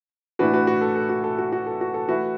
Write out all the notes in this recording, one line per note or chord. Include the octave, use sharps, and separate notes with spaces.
A2 E3 D4 F#4 B4
F#4 B4
F#4
A4
A4
F#4
A4
F#4
F#4
A4
F#4
A4
E3 A3 E4 F#4 B4